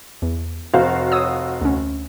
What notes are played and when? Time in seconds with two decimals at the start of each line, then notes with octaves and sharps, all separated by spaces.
0.22 E2
0.74 F1 F#4 C5 F5
1.12 C#5 D#6 E6
1.61 D2 C#4